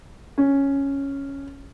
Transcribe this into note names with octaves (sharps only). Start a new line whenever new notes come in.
C#4